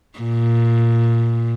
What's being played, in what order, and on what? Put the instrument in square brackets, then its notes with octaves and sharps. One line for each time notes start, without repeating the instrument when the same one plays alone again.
[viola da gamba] A#2